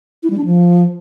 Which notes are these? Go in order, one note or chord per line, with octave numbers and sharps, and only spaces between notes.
E4
G3
D4
F3